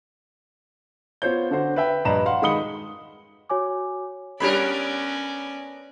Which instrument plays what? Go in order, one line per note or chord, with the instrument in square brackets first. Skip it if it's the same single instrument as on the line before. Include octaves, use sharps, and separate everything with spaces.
[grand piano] B3 F4 C5 C#5 G6
D3 F#4 C5
B4 E5 G5
A#1 G2 B4 D#5 A#5 E7
F5 F#5 C6
D#3 G#3 B5 D#6 C#7 G7
[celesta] F#4 C#5 G#5 D6
[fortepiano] G3 C#5 B5 [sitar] B3 D4 A#4 [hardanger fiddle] C#4 D5